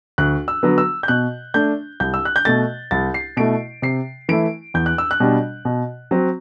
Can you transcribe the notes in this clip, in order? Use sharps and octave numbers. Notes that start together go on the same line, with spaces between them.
D2 F#6
E6
D3 F#3 B3
E6
G6
B2 F#6
A3 D4 G6
C2 G6
E6
F#6
G6
B2 A3 A6
C2 A6
C7
B2 A3 E4 D7
C3 C7
E3 A3 E4 D7
E2 G6
F#6
E6
F#6
B2 G3 D4
B2
F#3 C4